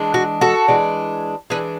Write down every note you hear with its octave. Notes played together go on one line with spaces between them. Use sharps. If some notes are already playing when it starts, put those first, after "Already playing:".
Already playing: E3 G#3 D4
F#4
F#4 A4
E3 G#3 D4
E3 G#3 D4 G#4 B4